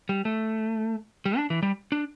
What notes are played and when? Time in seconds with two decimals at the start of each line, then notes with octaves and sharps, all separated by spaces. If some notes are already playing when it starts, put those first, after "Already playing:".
0.09 G3
0.25 A3
1.26 G3
1.37 D4
1.50 E3
1.63 G3
1.92 D4